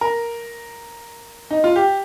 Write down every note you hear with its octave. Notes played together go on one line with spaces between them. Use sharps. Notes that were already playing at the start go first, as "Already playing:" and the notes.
A#4
D#4
F4
G4